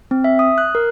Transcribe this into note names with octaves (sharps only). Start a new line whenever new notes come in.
C4
E5
D#6
F#6
A#4